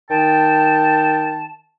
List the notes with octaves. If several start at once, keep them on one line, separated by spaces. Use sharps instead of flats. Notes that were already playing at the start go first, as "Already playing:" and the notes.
D#3 G5 A5